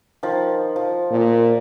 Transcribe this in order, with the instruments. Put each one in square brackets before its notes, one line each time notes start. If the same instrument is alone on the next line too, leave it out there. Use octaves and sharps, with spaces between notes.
[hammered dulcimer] D#3 F3
F3
[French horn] A#2